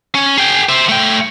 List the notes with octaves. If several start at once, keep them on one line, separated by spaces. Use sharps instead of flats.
C#4
G#4 G5
C5 E5
A3 G5